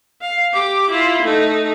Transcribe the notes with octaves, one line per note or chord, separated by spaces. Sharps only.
F5
G4 D6
E4 F4
A3 D#4